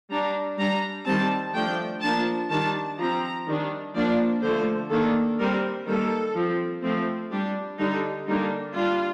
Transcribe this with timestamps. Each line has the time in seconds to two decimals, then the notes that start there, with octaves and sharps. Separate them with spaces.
0.10 G3 D4 A#5
0.58 G3 D4 A#5
1.06 D#3 G3 C4 A5
1.54 F3 A3 D4 G5
2.02 F3 A#3 D4 A5
2.50 D#3 G3 D4 A5
2.98 F3 C4 A#5
3.46 D#3 G3 D4
3.94 F3 A#3 D4 D5
4.42 D3 F3 A3 C5
4.90 D#3 A#3 D4 A4
5.38 G3 C4 A#4
5.86 D#3 G3 A#3 A4
6.35 F3 C4
6.83 F3 A3 C4
7.31 G3 D4 G4
7.79 D3 G3 D4 D#4
8.27 D3 G3 A#3 D4 D#4
8.75 G3 D4 F4